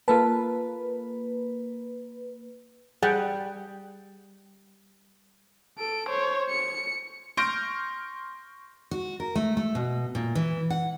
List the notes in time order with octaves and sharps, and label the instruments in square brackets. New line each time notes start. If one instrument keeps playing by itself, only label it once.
[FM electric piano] A#3 B4 [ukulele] F4 A4 A5
[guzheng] G3 [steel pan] G#4 F#5 G5
[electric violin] A4 D7
C5 C#5
C#7
[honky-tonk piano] C6 C#6 F6 G6 A#6 D7
[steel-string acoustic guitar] F#4
A#4
A3
A3
B2
A#2
E3
F#5